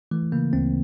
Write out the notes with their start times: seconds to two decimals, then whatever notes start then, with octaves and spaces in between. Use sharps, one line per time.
0.11 E3 A3
0.32 C#3 A#3
0.53 D2 C4